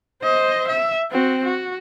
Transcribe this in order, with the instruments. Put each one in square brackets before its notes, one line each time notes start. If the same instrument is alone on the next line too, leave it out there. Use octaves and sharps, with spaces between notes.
[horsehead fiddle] C5 D#5
E5
C4 F#4
F#4